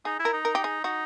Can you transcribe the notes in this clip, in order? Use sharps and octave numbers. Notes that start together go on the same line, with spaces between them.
D#4 G#4
E4
A#4
D#4
A#4
G4
G#4
D#4 F#4